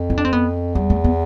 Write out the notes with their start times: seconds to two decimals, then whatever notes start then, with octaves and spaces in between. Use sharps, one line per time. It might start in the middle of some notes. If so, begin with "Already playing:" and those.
Already playing: F2
0.10 E4
0.18 D4
0.25 C4
0.33 B3
0.75 E2 G3
0.90 A3
1.04 B3